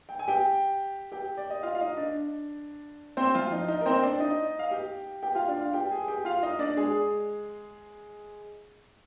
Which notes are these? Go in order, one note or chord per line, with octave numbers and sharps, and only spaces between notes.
G5
G#5
G4 G5
G4 G5
D5
D#5
F4 F5
F5
D#4 D#5
D4 D5
C4 C5
F3 F4
D#4
D#4
A#4
C4 C5
D4 D5
D#4 D#5
F5
G4 G5
G4 G5
F4 F5
D4 D5
F4 F5
G4 G5
G#4 G#5
G4 G5
F4 F5
D#4 D#5
D4 D5
G#3 G#4